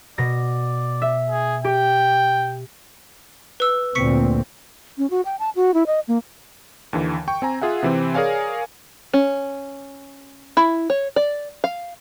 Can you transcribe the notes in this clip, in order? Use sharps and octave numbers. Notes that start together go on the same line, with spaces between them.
B2 D5 A#6
E5
G#4
G4 G5
B4 E6
D2 A#2 C4 C#6 B6 C#7
C#4
F#4
G5
A5
F#4
E4
D#5
A#3
D#2 D3 E3
G5 C#6
C4 G#5 A#5
F4 G#4 E5 F#5
C3 E3 C4
G#4 A#4 C#5 D5 F5 G#5
C#4
E4
C#5
D5
F5